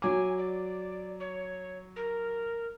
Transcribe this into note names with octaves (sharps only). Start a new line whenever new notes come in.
F#3 G#5 D6
D5
C#5
A#4